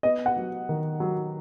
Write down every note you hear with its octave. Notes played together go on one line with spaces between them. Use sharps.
B3 D#5
F#5
F#3
D#3
F#3